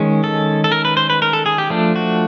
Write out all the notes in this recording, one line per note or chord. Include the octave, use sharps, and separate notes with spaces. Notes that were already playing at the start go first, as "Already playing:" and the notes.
Already playing: D#3 G#3 C#4
A4
A4
A#4
B4
C5
B4
A#4
A4
G#4
G4
F3 A3 D4
F#4